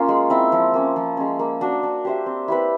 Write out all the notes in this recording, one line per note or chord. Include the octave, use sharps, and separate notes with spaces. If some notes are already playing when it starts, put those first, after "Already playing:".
Already playing: A#3 C#4 F4
G#3
C4 E4
F3
A#3 C#4
F3
G#3 C#4
A#3
D4 F#4
D4
G4 C5 E5
C4
E4 G4 B4